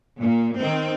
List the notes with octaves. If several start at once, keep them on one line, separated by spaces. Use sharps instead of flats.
A#2
D#3 C4